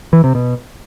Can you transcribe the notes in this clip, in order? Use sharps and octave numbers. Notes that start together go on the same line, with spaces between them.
E3
C3
B2